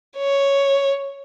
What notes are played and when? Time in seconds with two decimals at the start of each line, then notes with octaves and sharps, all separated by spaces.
0.18 C#5